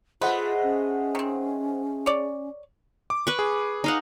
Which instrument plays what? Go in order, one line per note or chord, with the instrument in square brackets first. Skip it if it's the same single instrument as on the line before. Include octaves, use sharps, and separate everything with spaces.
[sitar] G#3 A3 [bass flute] F4 [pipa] B4 [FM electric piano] C5 D#5 F#5
[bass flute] C#4
[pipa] D#3 C4
C#5 D5
[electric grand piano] D6
[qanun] B4 C#6
[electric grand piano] G#4
[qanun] D#4 F5 F#5